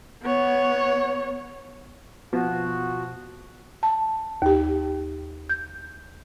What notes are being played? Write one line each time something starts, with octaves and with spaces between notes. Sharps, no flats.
B3 C#5
B2 F3 F#4
A5
D#2 G4
G6